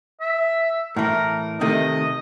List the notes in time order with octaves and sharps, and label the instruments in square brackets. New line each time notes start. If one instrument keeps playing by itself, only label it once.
[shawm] E5
[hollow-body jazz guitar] A2 E3 [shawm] A#4
[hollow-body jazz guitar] C3 D#3 A3 [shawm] D#5